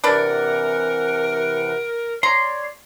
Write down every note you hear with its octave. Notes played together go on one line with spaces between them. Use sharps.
C3 E3 D4 A#4 B4 D5 F#5
C#5 D5 A#5 C6